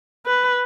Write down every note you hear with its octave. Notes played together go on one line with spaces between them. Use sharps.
B4